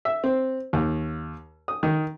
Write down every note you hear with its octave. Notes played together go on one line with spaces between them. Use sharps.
E5
C4
D#2
D#6
D#3